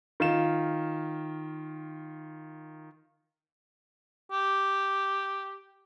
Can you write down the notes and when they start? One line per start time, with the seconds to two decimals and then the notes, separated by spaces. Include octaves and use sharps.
0.20 D#3 F4 E7
4.32 G4